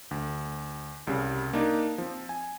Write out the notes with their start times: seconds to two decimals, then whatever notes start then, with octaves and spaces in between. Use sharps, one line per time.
0.11 D2
1.07 C2 C#3 G3
1.53 A#3 D4 D#4
1.98 F3 C4
2.29 G#5